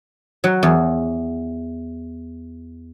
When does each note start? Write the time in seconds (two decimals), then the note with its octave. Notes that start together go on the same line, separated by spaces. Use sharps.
0.44 F#3
0.63 E2